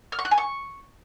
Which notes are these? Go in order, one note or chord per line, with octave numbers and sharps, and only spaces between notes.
F6
C#6
F#6
G#5
C#6